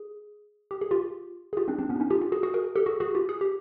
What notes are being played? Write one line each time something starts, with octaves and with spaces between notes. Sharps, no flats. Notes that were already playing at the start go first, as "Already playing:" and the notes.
Already playing: G#4
G4
G#4
F4 G4
G#4
F4 G4
C4 D4
C4 D4
B3 C#4
D4
C#4 D#4
F4 G4
F4 G4
F#4 G#4
F#4 G#4
G#4 A#4
G4 A4
F#4 G#4
F#4 G#4
F4 G4
G#4
G4